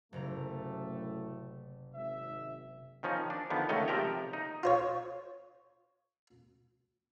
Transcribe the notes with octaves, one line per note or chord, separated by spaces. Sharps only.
F#1 F#2 A2 C3 A3 A#5
G#1 E5
D#3 F3 C#4 D#4
D4
D3 D#3 F3 B3
C#2 D#3 A3 C#5 D#5
C3 F3 A#4 E5 G5 A#5
D#4
F4 C5 C#5